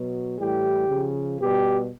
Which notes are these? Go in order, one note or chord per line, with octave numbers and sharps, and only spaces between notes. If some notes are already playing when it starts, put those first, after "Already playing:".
Already playing: B2 F#3
A2 E3 G3 G4
C#3 F3
B2 G3 G4